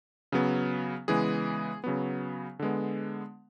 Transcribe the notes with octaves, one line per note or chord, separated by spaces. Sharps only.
C#3 F#3 B3
C#3 E3 G#3 B3 G#4
C#3 F#3 B3
D3 G#3 B3